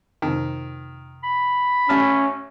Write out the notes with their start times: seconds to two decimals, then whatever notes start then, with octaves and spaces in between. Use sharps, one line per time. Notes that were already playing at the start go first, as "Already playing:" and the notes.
0.22 F2 C3 D#3
1.24 B5
1.89 A1 C#4 A5 F6